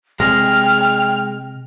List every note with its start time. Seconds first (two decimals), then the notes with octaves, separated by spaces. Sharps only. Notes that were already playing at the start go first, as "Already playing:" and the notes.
0.20 C3 G#3 G5 F6